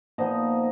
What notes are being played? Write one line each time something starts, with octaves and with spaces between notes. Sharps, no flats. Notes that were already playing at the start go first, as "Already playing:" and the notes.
A#2 F3 B3 D#4 D#5